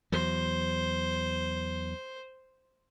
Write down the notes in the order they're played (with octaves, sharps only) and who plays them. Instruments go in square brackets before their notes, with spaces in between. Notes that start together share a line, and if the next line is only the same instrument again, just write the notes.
[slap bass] E2 F#3 [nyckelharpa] C5